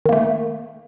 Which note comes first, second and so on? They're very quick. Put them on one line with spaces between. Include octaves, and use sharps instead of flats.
D#3 A#3 A3